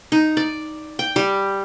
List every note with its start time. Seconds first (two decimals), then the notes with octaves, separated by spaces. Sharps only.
0.12 D#4
0.37 D5
0.99 G5
1.16 G3